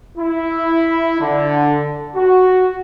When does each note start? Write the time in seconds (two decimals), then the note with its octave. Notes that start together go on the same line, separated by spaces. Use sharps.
0.18 E4
1.20 D3
2.15 F#4